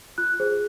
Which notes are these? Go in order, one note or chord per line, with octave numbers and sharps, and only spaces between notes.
F4 F#6
G#4 C5